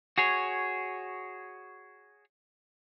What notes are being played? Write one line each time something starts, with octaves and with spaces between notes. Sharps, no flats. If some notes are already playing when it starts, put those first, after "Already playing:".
F#4 G#4 C#5